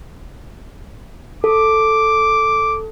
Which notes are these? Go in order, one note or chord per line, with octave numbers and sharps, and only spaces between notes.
A4 D6